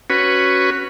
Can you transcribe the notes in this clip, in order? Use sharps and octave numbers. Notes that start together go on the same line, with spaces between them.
C#4 F#4 B4